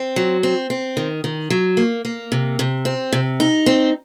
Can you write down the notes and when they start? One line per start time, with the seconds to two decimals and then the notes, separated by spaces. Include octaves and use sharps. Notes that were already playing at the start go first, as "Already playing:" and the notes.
Already playing: C4
0.16 F#3
0.43 C4
0.70 C4
0.97 D#3
1.24 D#3
1.50 F#3
1.77 A#3
2.05 A#3
2.32 C3
2.59 C3
2.85 C4
3.13 C3
3.40 D#4
3.66 C4